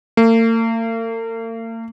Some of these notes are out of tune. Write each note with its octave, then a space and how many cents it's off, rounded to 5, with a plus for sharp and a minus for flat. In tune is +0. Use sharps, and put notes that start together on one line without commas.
A#3 -45